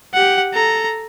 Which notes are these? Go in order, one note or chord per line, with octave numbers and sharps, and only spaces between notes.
G4 F#5
A4 A#5